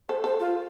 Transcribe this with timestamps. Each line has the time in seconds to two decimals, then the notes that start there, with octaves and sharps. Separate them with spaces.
0.09 A4 C5
0.24 A4 C5
0.40 F4